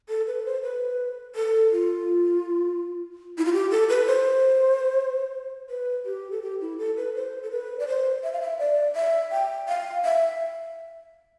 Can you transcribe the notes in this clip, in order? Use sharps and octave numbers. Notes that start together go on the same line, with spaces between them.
A4
B4
C5
B4
A4
F4
E4
F4
G4
A4
B4
C5
B4
G4
A4
G4
E4
A4
B4
C5
A4
B4
D5
C5
E5
F5
E5
D5
E5
G5
F5
E5